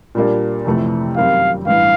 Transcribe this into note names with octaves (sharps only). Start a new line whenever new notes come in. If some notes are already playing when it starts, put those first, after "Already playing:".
A#2 G3 A#3 D4
F2 C3 E3 A3
F#2 D#3 G3 C4 F5
A1 G2 E3 F5